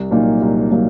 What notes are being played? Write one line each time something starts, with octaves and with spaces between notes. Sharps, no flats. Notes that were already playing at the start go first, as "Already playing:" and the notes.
Already playing: C2
A#2 F#3 A#3 D#4
C2
A#2 F#3 A#3 D#4